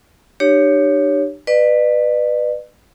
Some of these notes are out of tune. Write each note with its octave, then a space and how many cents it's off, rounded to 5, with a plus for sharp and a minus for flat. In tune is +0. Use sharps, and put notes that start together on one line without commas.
D4 +45 G4 +0 C#5 +10
B4 +0 D5 +45